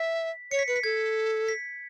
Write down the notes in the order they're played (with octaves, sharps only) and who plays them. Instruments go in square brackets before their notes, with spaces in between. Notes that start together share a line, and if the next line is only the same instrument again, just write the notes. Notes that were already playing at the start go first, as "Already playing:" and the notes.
Already playing: [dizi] E5 [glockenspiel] B6
[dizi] C#5 [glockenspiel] C#7
[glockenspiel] B6
[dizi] B4 [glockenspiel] C#7
[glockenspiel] B6
[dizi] A4 [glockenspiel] G#6
[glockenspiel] B6